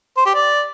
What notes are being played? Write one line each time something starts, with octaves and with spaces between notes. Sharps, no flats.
C5
G4
D5